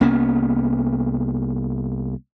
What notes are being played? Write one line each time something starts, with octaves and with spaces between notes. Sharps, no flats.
C2 A#3 B3 C#4